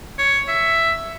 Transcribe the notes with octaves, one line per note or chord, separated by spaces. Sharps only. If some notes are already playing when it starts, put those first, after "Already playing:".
C#5
E5